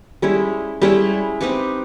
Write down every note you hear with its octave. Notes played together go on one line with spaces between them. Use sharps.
G3 G#3 C#4 E4
G3 G#3 C#4 E4
C4 D#4 G4 B4